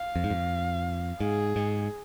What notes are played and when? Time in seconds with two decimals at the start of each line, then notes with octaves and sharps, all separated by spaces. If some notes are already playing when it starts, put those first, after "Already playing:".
Already playing: F5
0.16 F2
0.24 G#2
0.30 F2
1.20 G#2 G#4
1.56 G#2